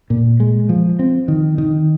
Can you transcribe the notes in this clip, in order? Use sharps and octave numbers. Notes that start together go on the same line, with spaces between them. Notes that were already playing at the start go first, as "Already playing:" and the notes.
A#2
G#3
F3
C4
D#3
D#3